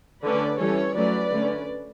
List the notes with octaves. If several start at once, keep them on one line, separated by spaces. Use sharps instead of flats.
D3 A3 C#4 B4 D5
E3 G3 C#4 A4 C#5
F#3 A3 C#4 B4 D5
D3 A3 C#4